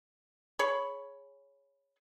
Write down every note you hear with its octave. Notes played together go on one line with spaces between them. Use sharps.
G#4 C#5 B5